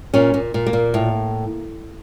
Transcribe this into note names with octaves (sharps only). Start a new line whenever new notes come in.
A#2 C#4
A#2
A#2
A#3
A#2
A2